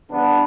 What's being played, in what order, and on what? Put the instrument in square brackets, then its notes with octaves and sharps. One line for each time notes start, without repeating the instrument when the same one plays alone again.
[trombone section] C#3 E3 G3 B3 D4